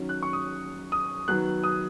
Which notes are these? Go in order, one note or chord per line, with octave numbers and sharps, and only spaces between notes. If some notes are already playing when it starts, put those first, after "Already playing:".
Already playing: D#3 F#3 C#4
F#6
C#6
D#6
D#6
D#3 F#3 B3 F#6
D#6